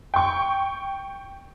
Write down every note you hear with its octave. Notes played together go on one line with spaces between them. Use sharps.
G5 C#6